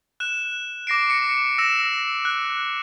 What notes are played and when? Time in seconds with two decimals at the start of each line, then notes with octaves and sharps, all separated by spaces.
0.20 F#6 E7
0.87 D6 A#6 C7 D7
1.10 C#7
1.58 E6 A#6 E7
2.25 F#6